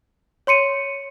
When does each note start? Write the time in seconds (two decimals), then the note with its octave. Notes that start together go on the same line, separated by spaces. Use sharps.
0.47 C#5 C6 C#7 D#7